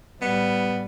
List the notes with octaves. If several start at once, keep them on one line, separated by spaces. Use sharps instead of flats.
A2 G3 B3